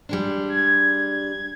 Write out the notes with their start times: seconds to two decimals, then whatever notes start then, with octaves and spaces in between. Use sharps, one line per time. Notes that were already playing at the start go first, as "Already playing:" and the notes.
0.09 G3 G#3 D4
0.49 G#6